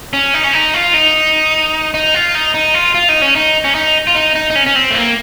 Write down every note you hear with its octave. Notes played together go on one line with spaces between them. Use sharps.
C#4
D#4
C#4
D#4
F4
D#4
D#4
F4
D#4
D#4
F4
F4
D#4
C#4
D#4
C#4
D#4
F4
D#4
D#4
D#4
C#4
C#4
C4
A3
A#3